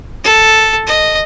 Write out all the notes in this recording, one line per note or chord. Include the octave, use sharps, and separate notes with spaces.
A4
D#5